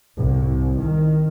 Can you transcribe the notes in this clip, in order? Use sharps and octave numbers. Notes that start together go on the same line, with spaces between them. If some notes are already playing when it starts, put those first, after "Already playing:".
C2
D#3